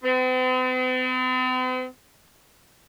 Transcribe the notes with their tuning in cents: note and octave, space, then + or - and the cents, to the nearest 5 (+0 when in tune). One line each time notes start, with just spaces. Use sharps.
C4 -45